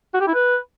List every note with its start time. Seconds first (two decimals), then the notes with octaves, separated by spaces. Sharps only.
0.14 F#4
0.21 G4
0.28 E4
0.34 B4